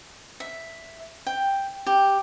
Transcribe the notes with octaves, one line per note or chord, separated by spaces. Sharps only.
E5
G5
G4